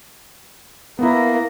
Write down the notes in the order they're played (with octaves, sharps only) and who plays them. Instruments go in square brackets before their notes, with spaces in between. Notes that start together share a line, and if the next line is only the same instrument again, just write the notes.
[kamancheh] A#3 A#5 [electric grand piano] B3 E4